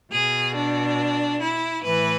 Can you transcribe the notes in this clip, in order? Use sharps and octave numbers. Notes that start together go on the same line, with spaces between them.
B2 G#4
D4
E4
A2 E3 B4